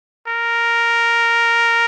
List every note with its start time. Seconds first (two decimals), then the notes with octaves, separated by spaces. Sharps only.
0.27 A#4